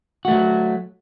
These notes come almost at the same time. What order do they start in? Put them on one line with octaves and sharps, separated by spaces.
F#4 A3 F#3